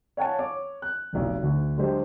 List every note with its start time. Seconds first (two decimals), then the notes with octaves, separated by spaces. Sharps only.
0.17 C#5 F5 F#5 G#5 A5
0.39 C#5 D6
0.82 F#6
1.13 F1 B1
1.43 D2
1.77 D3 F#3 G#3 G4 C5